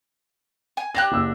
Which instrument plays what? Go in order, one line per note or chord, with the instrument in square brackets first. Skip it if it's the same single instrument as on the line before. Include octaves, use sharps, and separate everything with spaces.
[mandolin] G#5
[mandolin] D4 G4 F#6 [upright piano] A#6
[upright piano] F#1 E6